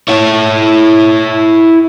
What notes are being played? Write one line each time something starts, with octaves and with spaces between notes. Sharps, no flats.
E4 C#5